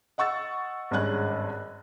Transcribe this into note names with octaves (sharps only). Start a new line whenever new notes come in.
D#5 F#5 C#6 E6 A6
G#1 G2 C#4 G#4 F#6